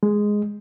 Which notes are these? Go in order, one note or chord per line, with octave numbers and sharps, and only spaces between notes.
G#3